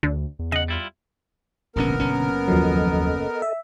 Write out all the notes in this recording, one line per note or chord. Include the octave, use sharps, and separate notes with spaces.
D2 D3
E2
C#3 D#5 F#5
G3 E4 F4
D1 A#1 B2 D3 B3 C#4 A#4
F#1 C#4
D#2 F3 F#3 A4 D#5
E5